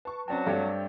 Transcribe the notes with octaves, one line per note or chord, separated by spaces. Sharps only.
B4 A5 C#6
F#3 C4 C#4 F#4 D5 G5 A5
G2 A3 C4 G4 A4 C#5 D5